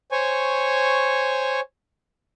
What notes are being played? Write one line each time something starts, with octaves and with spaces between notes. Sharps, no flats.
C5 C#5 G#5 C#6